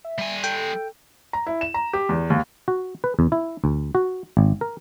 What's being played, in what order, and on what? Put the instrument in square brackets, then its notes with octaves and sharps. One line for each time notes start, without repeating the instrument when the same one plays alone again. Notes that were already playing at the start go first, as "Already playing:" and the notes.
[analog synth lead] E5
[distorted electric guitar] G3 G#5
[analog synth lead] A4 [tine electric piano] G5
[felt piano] A#5
E4
E7
A#5
G4
E2
D#2
[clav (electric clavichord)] F#4
B4
E2
E4
D2
F#4
G#1
A#4